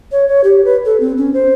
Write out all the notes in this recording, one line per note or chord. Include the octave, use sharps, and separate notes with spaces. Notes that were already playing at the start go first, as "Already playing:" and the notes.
C#5
C#5
G4
B4
A4
C4
C#4
C5